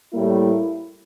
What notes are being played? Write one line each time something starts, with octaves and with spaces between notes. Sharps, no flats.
A2 G3 A#3 E4